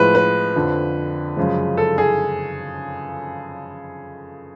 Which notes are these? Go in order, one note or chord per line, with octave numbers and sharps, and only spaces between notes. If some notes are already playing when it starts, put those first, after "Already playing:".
Already playing: A2 F3 G#3 B4
B4
F2 D3 F3
F#2 C#3 F3 G#3
A4
G#4